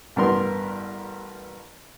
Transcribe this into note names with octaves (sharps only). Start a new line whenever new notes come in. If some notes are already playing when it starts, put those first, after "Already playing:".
A1 G2 B3 A#4 C6